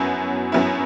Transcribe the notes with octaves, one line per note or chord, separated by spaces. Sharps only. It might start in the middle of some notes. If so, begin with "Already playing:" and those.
Already playing: F#2 F#3 B3 E4
F#2 F#3 B3 E4